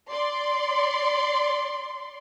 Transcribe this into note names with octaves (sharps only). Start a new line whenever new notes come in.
D5 C6